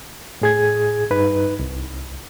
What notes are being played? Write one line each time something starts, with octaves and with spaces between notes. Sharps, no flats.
A2 G#4 G#6
G2 D#4 B4
C2